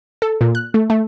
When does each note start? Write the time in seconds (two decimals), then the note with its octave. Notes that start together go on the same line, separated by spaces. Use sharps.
0.22 A4
0.41 A#2
0.55 F#6
0.74 A3
0.90 A3